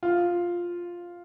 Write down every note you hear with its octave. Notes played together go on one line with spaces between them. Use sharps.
F4